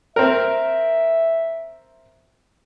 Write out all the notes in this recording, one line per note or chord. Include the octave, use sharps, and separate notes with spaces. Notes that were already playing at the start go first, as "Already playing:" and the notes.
C4 A#4 E5